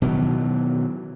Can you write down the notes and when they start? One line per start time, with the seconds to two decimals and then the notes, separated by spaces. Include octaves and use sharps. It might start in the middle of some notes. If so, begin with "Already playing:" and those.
0.02 B2 D#3 E3 F#3